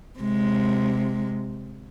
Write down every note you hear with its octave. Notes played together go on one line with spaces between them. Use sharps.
C3 G#3